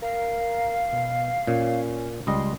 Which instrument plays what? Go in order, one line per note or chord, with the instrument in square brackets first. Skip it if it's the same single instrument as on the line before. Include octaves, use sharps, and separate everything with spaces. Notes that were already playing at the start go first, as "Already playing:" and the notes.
[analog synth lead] A#4 [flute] F5
[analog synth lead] B2
[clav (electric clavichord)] A#2 [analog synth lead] C#4
[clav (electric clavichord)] C#2 G3 D#5 [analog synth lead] C6